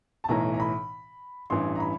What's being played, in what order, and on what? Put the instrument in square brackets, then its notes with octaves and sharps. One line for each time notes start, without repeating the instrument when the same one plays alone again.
[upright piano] A5
B1 A2 E3 A#5
A#5
B5
A1 G2 E3 C6
A#5
B5